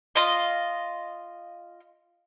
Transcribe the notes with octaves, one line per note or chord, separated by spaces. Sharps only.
F4 D#5